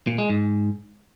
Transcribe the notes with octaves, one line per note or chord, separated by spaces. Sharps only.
A#2
G#3
G#2